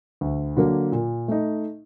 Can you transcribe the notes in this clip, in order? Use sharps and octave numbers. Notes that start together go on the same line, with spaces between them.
D2
D3 F#3 A#3
A#2
A3 D#4